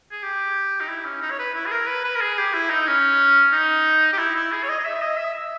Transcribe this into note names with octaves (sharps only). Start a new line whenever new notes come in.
G#4
G4
D#4
E4
C#4
D#4
C#5
B4
E4
G#4
A#4
B4
B4
A#4
G#4
G4
E4
D#4
C#4
D#4
G4
E4
E4
G#4
C#5
D#5
D#5
E5
D#5
E5
E5